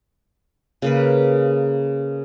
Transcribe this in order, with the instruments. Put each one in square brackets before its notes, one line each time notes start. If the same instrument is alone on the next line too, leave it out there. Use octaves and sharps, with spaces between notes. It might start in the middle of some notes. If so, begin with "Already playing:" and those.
[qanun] C#3 A#3 B4